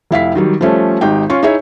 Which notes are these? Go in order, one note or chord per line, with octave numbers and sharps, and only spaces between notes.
F1 E4 F5 B6
D#3 F#3 G3
F3 G3 A3 C#4
G#1 D#4 G4 G5
C#4 F4 C#6
D#4 E4 G#4 C#5 E5